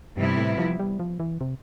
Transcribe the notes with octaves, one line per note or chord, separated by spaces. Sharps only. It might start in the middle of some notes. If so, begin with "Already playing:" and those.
G2 C3 E3 G3 B3 E4
A2
F3
G3
F3
E3
C3